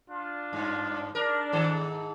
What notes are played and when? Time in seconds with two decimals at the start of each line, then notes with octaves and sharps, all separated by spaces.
0.10 D4 F4
0.53 G2
1.15 D4 A#4
1.52 G#2 D#3 A4